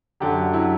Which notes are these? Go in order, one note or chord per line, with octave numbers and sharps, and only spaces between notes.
F#2 D3 F#3 G4
D3 F#3 E4